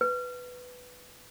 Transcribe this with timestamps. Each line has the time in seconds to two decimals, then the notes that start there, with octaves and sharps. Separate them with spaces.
0.01 B4